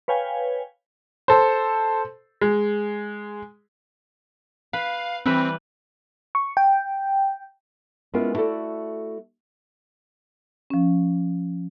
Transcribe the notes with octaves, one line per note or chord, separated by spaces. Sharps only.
B4 C#5 F5 G5 G#5
A4 C5
G#3
B4 F5
E3 G3 C4 B4
C#6
G5
G#3 B3 C#4 E4 F4 A#4
A3 E4 F#4 G#4 A4 D5
F3 C#4